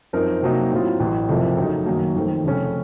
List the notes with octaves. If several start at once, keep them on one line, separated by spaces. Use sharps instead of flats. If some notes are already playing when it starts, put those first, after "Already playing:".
F#2 F3 C4 D#4 A#4
C3 F#3 A#3 D#4
A2 F#3 C4 F4
A1 A2 F#3
F#1 F2 C3 F3 A3
C#3 F#3 A3 D#4
F#2 D#3 F#3 A#3
F2 D#3 A3 C4
F1 F2 C#3 A3 C#4